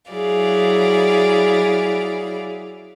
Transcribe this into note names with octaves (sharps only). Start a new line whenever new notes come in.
F#3 E4 G#4 D5 F5